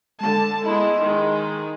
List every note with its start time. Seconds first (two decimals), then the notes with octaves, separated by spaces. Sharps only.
0.21 D3 G#3 A5
0.65 G#3 B3 E4 D#5 B5 C6
1.00 D#3 G#3